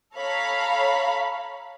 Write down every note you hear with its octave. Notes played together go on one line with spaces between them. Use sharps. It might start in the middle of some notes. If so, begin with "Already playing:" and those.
A4 C#5 F5 A#5 B5